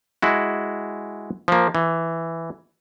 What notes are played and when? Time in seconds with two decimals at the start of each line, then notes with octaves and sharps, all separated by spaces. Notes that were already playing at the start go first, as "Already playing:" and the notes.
0.22 G#3 E4 F#4
1.48 F3 A#3
1.75 E3